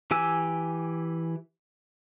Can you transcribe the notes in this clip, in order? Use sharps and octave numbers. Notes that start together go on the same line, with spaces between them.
E3 G4 G#5 E6